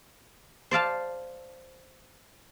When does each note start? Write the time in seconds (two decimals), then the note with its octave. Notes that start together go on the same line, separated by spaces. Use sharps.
0.71 C5 D5 F5 A5